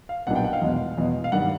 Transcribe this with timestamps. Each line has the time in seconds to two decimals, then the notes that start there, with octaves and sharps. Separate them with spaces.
0.09 F5
0.27 B1 A#2 G3 B3 D4 F#5
0.36 G5
0.45 F#5
0.53 F5
0.62 E2 B2 G#3
0.97 E2 B2 G#3
1.24 F5
1.32 G#1 G2 D#3 G3 F#5